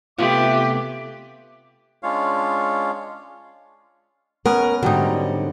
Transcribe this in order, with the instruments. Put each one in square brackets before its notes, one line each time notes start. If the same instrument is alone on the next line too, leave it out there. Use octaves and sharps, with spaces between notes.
[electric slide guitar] C3 A3 B3 [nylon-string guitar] F4 [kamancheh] G4 [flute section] E5 D6
[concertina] G#3 C#4 D4 F4 C#5 F5
[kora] B3 C#4 B4 [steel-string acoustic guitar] A#4
[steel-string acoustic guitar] G#2 D3 [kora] F#3 G3 D#4